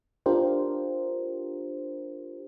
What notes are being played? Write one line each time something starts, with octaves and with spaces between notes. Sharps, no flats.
D4 F4 G4 A#4 C5